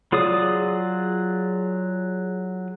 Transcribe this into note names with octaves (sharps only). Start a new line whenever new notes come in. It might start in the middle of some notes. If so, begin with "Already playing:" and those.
F#3 F4 G#4 D5 D#6